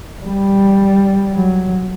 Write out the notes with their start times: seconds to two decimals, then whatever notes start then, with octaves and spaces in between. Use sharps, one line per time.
0.24 G3
1.33 F#3